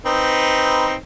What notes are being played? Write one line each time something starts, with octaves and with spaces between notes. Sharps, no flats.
C4 D#4 B4